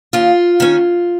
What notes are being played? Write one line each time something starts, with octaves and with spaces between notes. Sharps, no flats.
D#2 F4
D#3 C#4